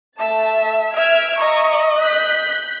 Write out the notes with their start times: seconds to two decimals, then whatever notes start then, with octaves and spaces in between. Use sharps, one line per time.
0.19 A3 E5 A5
0.96 E5 F6 G#6 D7
1.40 D#5 E5 A#5 C#6
1.99 F#6 G6 B6